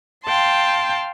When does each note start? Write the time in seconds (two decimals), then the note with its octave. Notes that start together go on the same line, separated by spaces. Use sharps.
0.24 F5 G5 A5 C6